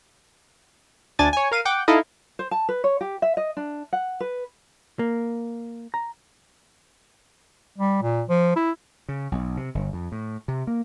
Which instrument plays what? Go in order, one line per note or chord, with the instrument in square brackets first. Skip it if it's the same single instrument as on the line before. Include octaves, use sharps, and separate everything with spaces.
[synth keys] D2 D4 G#5 A6
C#5 G#5
A#4 F5 D#7
F#5 G5 D6
D#4 E4 A4 D#5 F5
[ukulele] C5
A5
B4
C#5
G4
E5
D#5
D4
F#5
B4
[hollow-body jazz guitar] A#3
A#5
[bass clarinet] G3
A#2
F3
E4
[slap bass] C#3
B1
C3
G1
F2
A2
C3
A#3